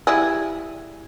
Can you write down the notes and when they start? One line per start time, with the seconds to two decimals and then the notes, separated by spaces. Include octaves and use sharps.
0.07 G3 E4 G#4